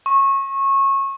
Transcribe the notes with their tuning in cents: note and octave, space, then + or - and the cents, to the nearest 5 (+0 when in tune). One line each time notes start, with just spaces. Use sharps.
C#6 -25